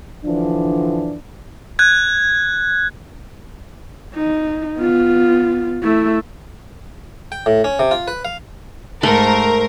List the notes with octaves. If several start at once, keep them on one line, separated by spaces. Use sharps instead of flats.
D3 E3 F3 D4
F#6 G#6
D#4
B3 F4
A3 E4
G5
A2
C#4
C3
F4
B4
F5
G#2 A3 A#4 C5